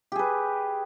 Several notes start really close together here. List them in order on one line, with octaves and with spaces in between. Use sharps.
G4 G#4 B4